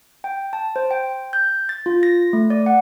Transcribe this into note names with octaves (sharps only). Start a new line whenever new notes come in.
G5
A5
C5
G5
G6
A6
F4
A#6
A3
D5
F#5